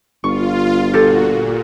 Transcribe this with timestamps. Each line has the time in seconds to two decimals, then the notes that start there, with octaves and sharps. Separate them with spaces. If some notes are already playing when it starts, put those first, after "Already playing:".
0.24 G1 F4 C#6
0.93 A#2 F#4 G4 A4 A6
1.28 A#2